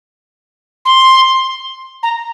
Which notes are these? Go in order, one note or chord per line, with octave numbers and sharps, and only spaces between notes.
C6
A#5